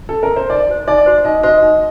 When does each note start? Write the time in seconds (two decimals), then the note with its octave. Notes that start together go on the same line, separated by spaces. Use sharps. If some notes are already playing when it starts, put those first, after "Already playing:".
0.09 A4
0.23 A#4
0.36 C5
0.49 D#4 D5
0.69 F#4 C5
0.87 D#4 D5
1.06 F#4 C5
1.25 D#4 D#5
1.43 F#4 C5 D#5
1.63 D#4